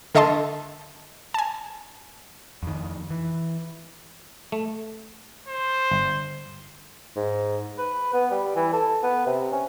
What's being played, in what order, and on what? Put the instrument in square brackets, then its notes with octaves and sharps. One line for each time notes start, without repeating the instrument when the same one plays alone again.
[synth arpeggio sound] D3 A4 D#5 E5 A5 C6
G#5 A5
[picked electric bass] F2 D#3
E3
[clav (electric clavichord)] A3
[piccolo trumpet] C5
[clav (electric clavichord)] G1
[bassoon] G#2
B4
B3
G3
E3
A4
B3
C3
C#4